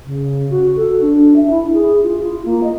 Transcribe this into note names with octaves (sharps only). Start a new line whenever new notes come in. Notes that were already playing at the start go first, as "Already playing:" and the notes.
C#3
F#4
A4
D4
E5
E4
G#4
F4
F4
A#3
D#5